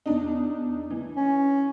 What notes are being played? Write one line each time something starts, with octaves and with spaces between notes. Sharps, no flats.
E2 D4 D#4
E3
C#4